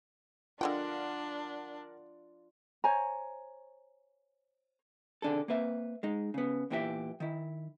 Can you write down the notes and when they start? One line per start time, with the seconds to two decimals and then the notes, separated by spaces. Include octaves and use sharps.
0.61 D3 G#3 D4 F4 A#4 D5 F#5 G5
2.84 C5 C#5 G#5 A#5
5.22 C3 D#3 D4 G#4 A4
5.48 A#3 C4 B4 E5
6.03 G#3 D#4
6.34 C#3 B3
6.70 E2 A#2 E3 G4 G#4 E5
7.20 D#3 E4